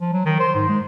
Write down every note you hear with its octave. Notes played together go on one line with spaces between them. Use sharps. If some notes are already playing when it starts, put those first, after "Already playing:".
F3
F#3
D#3
C5
G#2
G#3